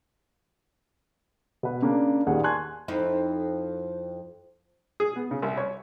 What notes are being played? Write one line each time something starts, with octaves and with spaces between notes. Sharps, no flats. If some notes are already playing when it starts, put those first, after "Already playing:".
B2 B4
C#3 A#3 D4
D#1 D#2 G#4 D5 F#5
G#5 A5 C6 C#6 F#6 G#6
F2 D#4 E4
G#4
B3
C#3
C2
C#5